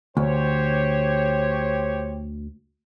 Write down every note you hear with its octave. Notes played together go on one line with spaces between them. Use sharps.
D2 G4 C5 C#5